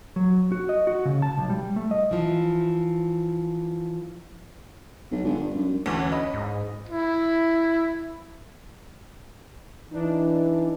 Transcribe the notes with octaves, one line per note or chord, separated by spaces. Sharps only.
F#3
F#4
D#5
F#4
C#3
A5
B1
G3
A3
D#5
E3 F3
B1
G1
G2
F#2
D2 D3 E3 C#4
D#5 B5
G#2
E4
E3 D4 D#4